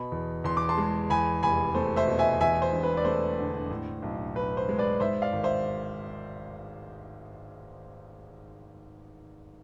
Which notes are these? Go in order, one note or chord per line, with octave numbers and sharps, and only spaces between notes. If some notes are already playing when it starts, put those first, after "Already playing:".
Already playing: B2 B5
E2
E2 C6
D6
A5 C6
G#3
E2 G#5 B5
F1 G#5 B5
A3 C5
C5 E5
B2
E5 G#5
E2 E5 G#5
C5
E1
B4
D5
A3 C5
D3
A2
B1
B1 B4
C5
G#3
B4 D5
G#2 C5 E5
D5 F5
G#1
C5 E5